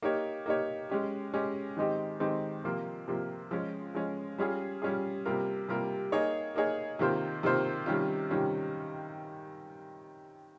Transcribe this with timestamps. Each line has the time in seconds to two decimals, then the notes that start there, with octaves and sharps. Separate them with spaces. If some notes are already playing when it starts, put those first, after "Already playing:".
0.02 A#3 D#4 G4 C#5
0.46 A#3 D#4 G4 C#5
0.90 G#3 C#4 G4
1.33 G#3 C#4 G4
1.77 D#3 G#3 C4 D#4 G4
2.20 D#3 G#3 C4 D#4 G4
2.64 C3 F3 A#3 F4
3.08 C3 F3 A#3 F4
3.51 F3 G#3 C#4
3.95 F3 G#3 C#4
4.38 G3 C#4 F4 G#4
4.82 G3 C#4 F4 G#4
5.25 C3 G3 A#3 F4 A#4
5.69 C3 G3 A#3 F4 A#4
6.12 A#3 D#4 G#4 C#5
6.56 A#3 D#4 G#4 C#5
6.99 C3 D#3 A#3 F4 C5
7.43 C3 D#3 A#3 F4 C5
7.86 C3 D#3 G3 C#4 F4
8.30 C3 D#3 G3 C#4 F4